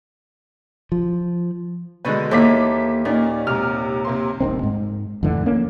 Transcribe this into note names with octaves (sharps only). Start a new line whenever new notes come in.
F3
B2 D3 D#3 G#3 B4
D#2 E3 A#3 A4 D6 B6
A#2 C#4 D#4 D5
G#2 C3 F6
C3 A#3 C6
D#1 G#1 D#3 C4
G#2
F2 A2 D3 E3
A#3 C#4